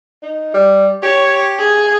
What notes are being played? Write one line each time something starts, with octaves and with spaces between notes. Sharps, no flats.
D#4
G3
G4 C#5
G#4